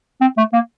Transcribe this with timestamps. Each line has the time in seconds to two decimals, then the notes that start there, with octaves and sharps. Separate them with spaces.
0.21 C4
0.37 A3
0.53 A#3